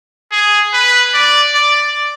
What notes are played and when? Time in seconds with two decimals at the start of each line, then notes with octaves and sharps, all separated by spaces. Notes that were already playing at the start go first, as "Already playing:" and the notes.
0.32 G#4
0.73 B4
1.14 D5
1.55 D5